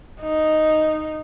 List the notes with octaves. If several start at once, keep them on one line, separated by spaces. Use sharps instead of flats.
D#4